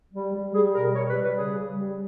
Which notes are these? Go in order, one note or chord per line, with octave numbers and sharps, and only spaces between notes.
G3
G3
G3 G#4
B2 A#4
G3 C#5
B4
G3
B4
C#3 G#4
G3
G3